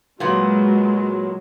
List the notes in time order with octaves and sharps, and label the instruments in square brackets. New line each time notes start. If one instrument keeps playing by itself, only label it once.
[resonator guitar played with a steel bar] A#2 B3 [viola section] F#3 G#3